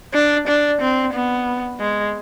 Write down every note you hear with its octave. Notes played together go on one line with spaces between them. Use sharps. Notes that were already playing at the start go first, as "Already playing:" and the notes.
D4
D4
C4
B3
G#3